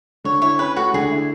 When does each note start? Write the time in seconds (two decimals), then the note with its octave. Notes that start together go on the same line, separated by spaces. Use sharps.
0.24 D3 C#5
0.41 E4 C#5
0.59 C#4 B4
0.76 A3 F#4
0.94 D3 G#4
1.11 E4